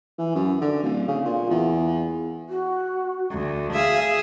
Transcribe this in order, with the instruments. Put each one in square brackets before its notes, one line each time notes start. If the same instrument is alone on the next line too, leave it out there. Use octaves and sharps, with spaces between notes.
[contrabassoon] E3
F#2
D3
D1
C#3
A#2
E2
[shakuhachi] F#4
[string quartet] D2
[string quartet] G#4 E5 [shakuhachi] F5